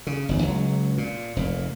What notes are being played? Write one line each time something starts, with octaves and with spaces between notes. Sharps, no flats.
C#3
G1 E2 G2
C#2 F#3
A#2
F1 A#2